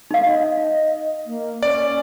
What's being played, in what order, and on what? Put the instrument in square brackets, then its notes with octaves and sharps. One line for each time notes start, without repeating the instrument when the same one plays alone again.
[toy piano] D#4 F5
[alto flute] D#5
A#3
[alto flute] C#4 [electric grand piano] D5